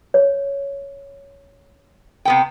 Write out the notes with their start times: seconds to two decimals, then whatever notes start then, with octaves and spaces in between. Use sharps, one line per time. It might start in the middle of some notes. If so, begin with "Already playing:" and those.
0.14 C#5
2.25 C3 B3 G5